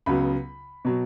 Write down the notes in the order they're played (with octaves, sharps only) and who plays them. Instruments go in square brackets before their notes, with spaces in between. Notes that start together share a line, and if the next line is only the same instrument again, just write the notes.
[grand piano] C#2 C#3 F#3 B3 B5
B2 F#3